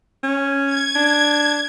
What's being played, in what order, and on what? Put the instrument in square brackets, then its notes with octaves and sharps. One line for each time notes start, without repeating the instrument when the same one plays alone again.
[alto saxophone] C#4
[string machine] G#6
[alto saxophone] D4